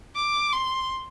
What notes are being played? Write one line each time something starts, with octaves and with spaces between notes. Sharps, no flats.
D6
C6